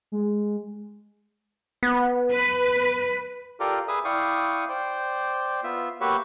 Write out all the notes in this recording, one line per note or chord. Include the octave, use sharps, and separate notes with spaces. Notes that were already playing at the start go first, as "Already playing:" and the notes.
G#3
B3
B4
F4 G4 A4 A#4 D5
G#4 B4 E5 D#6
E4 D5 F5 G5 C#6 D#6
C5 D5 G5
B3 F4 E5
A#3 F#4 G4 B4 C#5 E5